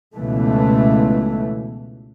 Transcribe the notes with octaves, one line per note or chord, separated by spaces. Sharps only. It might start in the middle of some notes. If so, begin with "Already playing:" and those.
C#2 B2 E3 A3